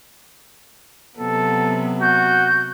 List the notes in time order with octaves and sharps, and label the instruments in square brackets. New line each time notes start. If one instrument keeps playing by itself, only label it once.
[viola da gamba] C3 F#3 B3 [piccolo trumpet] A4
[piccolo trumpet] F#4 [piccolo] G6